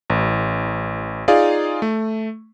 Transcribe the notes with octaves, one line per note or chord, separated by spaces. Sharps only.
A1
D#4 F4 G#4 D5 F5
A3